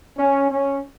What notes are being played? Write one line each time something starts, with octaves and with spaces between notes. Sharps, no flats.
C#4
C#4